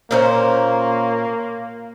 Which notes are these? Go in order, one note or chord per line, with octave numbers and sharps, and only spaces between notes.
A#2 A#3 C#4 C5